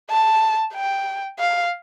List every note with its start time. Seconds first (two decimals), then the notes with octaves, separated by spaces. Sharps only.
0.10 A5
0.74 G5
1.39 F5